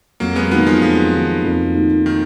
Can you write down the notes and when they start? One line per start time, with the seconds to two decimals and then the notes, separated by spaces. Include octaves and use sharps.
0.20 F2 F#3 A#3
0.36 G#3 B3
0.51 D#3 G#3 A#3 B3 D#4 F#4
0.67 F3 G#3
0.82 F2 F3
1.13 D#3 A#3 D#4 F#4
1.44 F2
1.75 D#3 A#3 D#4 F#4
2.06 D#3